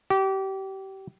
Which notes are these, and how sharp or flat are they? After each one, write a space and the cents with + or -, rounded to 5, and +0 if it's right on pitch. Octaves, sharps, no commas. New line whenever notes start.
G4 -30